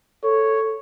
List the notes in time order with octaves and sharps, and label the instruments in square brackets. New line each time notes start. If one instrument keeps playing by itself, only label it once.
[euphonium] A4 [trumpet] C#5